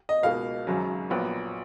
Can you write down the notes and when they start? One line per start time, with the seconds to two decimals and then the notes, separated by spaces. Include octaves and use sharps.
0.09 D#5
0.23 C#2 B2 A#3 D#4 F5
0.67 G#1 F#2 C#3 F#3
1.10 A#1 A#2 F#3 B3